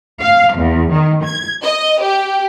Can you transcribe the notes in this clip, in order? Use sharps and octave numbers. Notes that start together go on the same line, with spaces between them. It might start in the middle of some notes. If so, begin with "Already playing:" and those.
F5
E2
D#3
G#6
D#5
G4